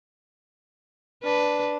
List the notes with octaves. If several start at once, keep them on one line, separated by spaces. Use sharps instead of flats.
D4 B4